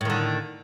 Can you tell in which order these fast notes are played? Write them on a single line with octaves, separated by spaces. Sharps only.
A2 D#3 D3